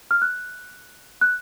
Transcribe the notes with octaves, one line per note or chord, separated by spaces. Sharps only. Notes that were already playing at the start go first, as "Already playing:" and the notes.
F6
F#6
F#6